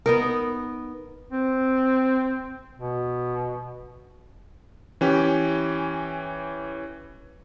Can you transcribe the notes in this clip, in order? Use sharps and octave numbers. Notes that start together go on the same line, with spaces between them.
B3 D#4 A#4
C4
B2
E3 C#4 G4